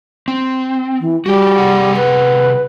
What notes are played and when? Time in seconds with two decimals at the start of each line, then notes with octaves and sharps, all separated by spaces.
0.28 C4
1.00 E3
1.26 G3 F#4 G4
1.58 C3 G#4 F#5
1.96 B4